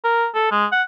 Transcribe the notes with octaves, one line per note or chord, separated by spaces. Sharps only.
A#4
A4
G#3
F#5